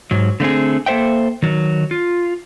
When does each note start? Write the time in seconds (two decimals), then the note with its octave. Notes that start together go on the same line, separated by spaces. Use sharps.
0.11 G#2 F#3
0.40 D3 A3 C4 G#4
0.86 A#3 A4 C5 E5 G5
1.42 D#3 F#3
1.91 F4